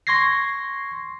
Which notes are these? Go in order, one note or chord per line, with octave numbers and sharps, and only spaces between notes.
C6 C#6 G#6 A#6 C7